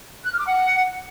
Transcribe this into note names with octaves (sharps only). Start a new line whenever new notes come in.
F#6
F6
D6
F#5